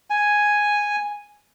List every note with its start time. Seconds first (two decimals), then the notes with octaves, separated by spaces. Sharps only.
0.10 G#5